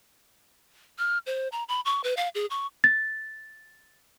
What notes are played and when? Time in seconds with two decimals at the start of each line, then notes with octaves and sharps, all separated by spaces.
0.98 F6
1.26 C5
1.52 A#5
1.69 B5
1.85 C#6
2.04 B4
2.17 F5
2.35 G#4
2.50 C#6
2.84 A6